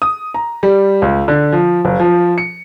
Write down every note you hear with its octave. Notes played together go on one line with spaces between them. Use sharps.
D#6
A#5
G3
C#2
D3
F3
F#1
F3
C#7